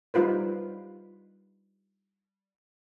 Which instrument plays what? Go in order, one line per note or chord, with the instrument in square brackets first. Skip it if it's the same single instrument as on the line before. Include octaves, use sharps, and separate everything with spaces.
[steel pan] G3 D#4 F4 B4 C5